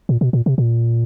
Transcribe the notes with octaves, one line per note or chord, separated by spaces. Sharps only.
A#2
B2
A#2
C3
A#2